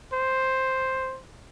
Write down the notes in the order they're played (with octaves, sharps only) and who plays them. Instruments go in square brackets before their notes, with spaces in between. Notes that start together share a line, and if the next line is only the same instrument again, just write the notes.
[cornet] C5